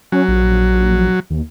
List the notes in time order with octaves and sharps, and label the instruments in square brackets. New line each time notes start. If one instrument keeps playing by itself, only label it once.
[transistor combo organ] F#3 [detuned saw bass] C#4
[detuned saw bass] A#1
D#2